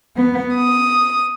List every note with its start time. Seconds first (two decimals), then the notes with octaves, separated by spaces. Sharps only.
0.16 B3
0.56 D#6